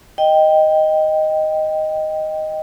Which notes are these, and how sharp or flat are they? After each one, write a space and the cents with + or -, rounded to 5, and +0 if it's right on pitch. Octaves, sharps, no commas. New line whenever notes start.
D#5 +0 G5 +0